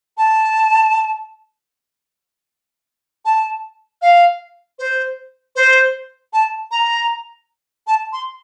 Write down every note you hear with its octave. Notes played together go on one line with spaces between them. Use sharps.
A5
A5
F5
C5
C5
A5
A#5
A5
C6